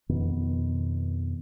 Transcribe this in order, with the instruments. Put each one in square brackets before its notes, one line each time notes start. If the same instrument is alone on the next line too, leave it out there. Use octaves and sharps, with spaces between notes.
[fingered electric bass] F2 B2 D#3 B3